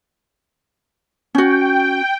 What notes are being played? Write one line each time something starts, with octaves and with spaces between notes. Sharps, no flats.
C#4 F#4 G5